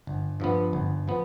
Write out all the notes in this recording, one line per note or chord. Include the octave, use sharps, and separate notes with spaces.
G1
G2 F3 B3
G1
F3 B3